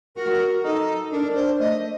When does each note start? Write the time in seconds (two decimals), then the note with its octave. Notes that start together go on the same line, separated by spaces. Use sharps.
0.16 F#4 A#4
0.63 D#4 A4
1.12 D4 A#4
1.35 C5
1.59 A3 D#5